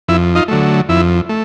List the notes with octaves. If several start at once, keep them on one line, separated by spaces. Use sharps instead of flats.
F2 E4
D#4 F4
D3 F#3 A3
F2 E4
A3